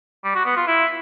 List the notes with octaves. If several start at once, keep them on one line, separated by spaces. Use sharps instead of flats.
G3
F#4
B3
F4
E4